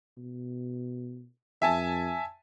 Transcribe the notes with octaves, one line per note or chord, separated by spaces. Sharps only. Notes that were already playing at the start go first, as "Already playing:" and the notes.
B2
F2 E5 G#5 A5